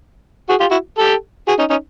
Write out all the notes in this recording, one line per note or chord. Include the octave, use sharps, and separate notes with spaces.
F#4 G#4
F4 G4
E4 F#4
G4 A4
F#4 G#4
C#4 D#4
C#4 D#4